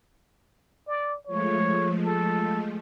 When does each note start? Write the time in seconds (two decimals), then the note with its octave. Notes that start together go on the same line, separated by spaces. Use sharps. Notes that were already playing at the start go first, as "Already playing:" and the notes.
0.88 D5
1.27 F3 G#3 A3 C#5
2.05 A4